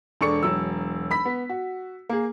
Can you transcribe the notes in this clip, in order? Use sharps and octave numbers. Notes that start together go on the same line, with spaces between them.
E1 D4 A4 C#6 C#7
E1 F#3 E6
B5 B6
B3
F#4
A#3 G#4